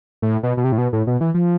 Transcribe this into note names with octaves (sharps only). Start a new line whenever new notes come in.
A2
B2
B2
C3
A2
B2
A2
B2
E3
F3